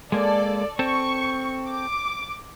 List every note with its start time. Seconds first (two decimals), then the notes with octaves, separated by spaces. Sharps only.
0.12 G#3 A#3 A4 D5
0.79 C4 A4 C#6
1.68 D6